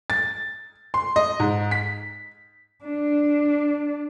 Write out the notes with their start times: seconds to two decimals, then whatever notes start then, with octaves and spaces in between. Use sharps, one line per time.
0.10 A6
0.94 C6
1.16 D#5
1.40 G#2
1.71 B6
2.85 D4